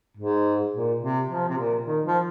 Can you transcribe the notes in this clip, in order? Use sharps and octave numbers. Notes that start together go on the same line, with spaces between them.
G#2
A#2
C3
F3
C3
A#2
D#3
F3